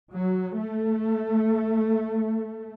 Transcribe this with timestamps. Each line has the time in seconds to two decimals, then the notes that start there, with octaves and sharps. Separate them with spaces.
0.13 F#3
0.57 A3